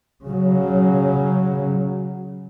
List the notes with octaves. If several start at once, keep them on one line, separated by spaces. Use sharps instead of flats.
C#3 F#3